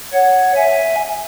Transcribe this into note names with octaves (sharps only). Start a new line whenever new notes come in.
C#5 F#5
E5 G#5